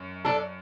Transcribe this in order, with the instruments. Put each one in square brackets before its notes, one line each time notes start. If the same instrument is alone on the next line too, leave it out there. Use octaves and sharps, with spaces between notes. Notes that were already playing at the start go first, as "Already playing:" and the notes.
Already playing: [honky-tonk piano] F#2
[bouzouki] D4 A4